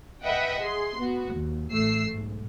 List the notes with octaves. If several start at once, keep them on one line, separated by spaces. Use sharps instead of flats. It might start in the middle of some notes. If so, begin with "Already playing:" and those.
B4 D#5 E5 F#5 G5
G#4 C6
B3 F#4
D#2
A1 A3 E6 C7
B1 G#2